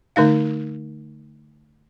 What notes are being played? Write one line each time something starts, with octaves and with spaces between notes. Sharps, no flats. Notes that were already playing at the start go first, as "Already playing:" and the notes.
D3 A3 D#4 F5